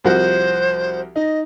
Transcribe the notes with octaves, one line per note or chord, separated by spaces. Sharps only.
C2 F3 F#4 C5
D#4 D#5